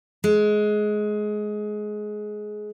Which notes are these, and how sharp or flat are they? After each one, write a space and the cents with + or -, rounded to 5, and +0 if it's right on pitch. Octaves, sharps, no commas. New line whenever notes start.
G#3 +20